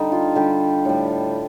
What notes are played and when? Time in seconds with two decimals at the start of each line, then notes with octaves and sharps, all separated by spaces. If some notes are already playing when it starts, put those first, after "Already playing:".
Already playing: D3 G3 D#4
0.12 F4
0.35 D3 G3 G4
0.85 A2 G3